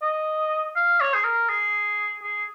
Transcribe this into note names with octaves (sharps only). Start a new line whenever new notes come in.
D#5
F5
C#5
G#4
A#4
G#4
G#4